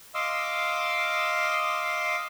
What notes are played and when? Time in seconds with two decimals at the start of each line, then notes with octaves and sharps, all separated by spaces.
0.14 D#5 F5 C6 D6 E6